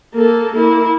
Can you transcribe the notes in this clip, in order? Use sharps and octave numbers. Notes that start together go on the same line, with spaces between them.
A#3 A4
A#3 E4